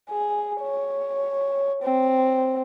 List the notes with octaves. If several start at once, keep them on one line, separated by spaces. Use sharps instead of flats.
G#4
C#5
C4